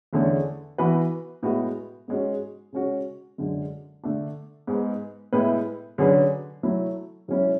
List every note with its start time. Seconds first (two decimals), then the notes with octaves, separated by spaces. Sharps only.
0.13 E2 D3 A3 C#4 G#4
0.78 E3 B3 F#4 B4
1.43 A2 G#3 B3 F#4
2.08 G#2 G#3 C#4 F#4
2.72 C#3 G#3 C#4 F#4
3.38 F#2 D3 G#3
4.04 D3 A3 D4
4.67 G#2 G#3 B3
5.33 A2 G#3 B3 E4 B4
5.98 D3 F#3 C#4 G#4 B4
6.63 F#3 A3 E4
7.28 G#2 F#3 C#4 E4